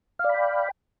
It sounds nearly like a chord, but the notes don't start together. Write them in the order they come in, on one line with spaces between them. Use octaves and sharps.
F5 D5 B5 G5